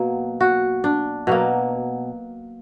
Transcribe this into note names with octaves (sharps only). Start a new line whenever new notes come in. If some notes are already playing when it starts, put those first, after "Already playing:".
Already playing: B2 F#3 A#3
F#4
D4
B2 F#3 A#3